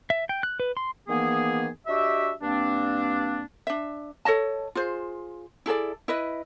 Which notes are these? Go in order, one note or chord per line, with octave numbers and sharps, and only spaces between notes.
E5
G5
F#6
B4
C6
D#3 E3 A#3 B3 G#4
D4 F#4 G4 D#5 E5
G2 A#3 C4 D4
D4 E5
A4 C#5 D#5 A5
F4 G#4 C5
E4 G#4 A4 D5
E4 B4 D#5